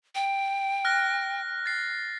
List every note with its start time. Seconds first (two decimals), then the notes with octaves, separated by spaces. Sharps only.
0.15 G5
0.85 F6 F#6 A#6
1.66 A6 C7